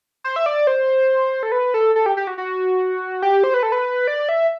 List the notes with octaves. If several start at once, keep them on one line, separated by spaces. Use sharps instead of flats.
C5
E5
D5
C5
A4
B4
A4
A4
G4
G4
F#4
F#4
G4
C5
B4
A4
B4
D5
E5